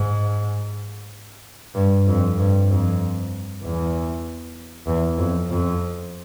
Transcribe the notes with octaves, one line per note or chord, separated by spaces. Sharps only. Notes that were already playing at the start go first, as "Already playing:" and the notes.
Already playing: G#2
G2
F2
G2
F2
E2
E2
F2
F2